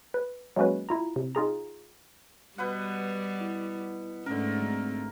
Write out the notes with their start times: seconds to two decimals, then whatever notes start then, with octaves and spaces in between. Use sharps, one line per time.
0.14 B4
0.56 F#3 G#3 A#3 C#4 F#4 B4
0.89 E4 F4 A#5
1.16 C3
1.35 D#4 F4 G#4 A#5
2.58 B2 G3 B4 F#5
3.41 E4
4.26 G#2 D3 A3 C#4 A#4
4.62 G#3 C4